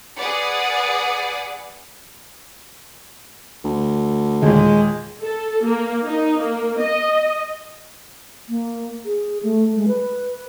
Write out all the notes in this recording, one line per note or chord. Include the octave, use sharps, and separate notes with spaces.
G#4 B4 D5 F#5
D2
D#2 A#2 G#3
A4
A#3
D#4
A#3
D#5
A#3
G#4
A3
G#3
B4